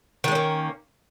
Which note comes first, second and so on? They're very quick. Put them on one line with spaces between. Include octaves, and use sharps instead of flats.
D#3 G#3 C#4 A#3